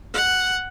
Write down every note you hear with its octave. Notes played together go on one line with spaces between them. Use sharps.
F#5